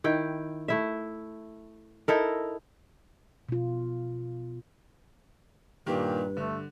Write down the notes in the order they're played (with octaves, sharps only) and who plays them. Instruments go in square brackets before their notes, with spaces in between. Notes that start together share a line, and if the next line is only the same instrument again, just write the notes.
[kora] D#3 E4 G5
A3 E4 E5
D#4 E4 A4 A#4
[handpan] B2 F4
[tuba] G2 [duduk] A#2 [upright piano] D#3 A#3 G4 [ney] B4
[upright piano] D3 [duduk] A3